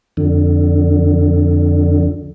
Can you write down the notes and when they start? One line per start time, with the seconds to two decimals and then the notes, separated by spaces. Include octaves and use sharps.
0.17 F2 D3